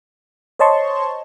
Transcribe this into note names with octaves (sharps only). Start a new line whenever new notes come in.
C5 C#5 D#5 A5 C6 C#6